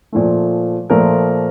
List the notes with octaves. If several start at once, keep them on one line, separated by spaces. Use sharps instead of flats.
A#2 F3 A3
A#2 F3 A3 A#4